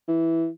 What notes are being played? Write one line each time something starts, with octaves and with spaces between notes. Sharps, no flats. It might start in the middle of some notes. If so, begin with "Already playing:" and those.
E3